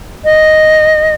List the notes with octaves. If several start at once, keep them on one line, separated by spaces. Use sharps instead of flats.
D#5